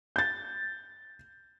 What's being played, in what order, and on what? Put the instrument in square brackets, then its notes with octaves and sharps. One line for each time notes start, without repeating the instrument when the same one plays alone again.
[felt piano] G6 A6